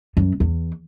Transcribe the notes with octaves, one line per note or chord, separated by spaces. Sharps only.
F#2
E2